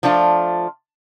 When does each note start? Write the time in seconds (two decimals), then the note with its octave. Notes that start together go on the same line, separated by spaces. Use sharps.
0.03 F3 A3 D4 F4